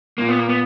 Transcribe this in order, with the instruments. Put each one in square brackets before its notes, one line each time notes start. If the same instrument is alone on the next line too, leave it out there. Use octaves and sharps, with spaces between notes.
[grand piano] A#2 [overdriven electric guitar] A#3
[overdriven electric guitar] B3
A#3
B3